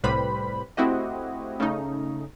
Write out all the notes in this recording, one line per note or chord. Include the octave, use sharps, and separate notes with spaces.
C2 A2 G3 B4 C5 B5
A3 C4 E4 F#4 G4 D#5
C#3 A3 C#4 D#4